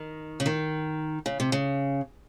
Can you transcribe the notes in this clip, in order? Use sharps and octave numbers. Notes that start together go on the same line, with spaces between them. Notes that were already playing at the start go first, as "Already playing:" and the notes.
Already playing: D#3
C#3
D#3
C#3
C3
C#3